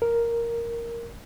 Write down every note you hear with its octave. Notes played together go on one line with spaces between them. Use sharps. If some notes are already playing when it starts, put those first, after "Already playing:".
A#4